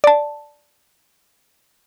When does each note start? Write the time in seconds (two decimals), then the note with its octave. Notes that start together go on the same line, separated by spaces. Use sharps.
0.04 D5 A5